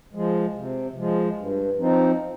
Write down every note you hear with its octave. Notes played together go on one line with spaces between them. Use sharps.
F3 G#3
C3
F3 G#3
G2
F3 C4 D#4